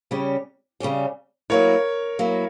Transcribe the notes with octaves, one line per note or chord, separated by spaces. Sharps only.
C#3 G3 C#4 G4
C#3 G3 C#4 G4
F#3 A#3 E4 A#4 C#5
F#3 A#3 E4